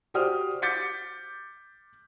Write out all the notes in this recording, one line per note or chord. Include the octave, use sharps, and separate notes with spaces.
F#4 G4 C5 D5 D#6 F6
D6 G6 A6 B6 C#7